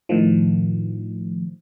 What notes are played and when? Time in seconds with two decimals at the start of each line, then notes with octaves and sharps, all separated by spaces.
0.09 A2 D#3 F3